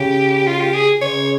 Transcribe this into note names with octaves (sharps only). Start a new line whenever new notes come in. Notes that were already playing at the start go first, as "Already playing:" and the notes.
Already playing: C#3 G4
F4
G4
G#4
C#3 C#5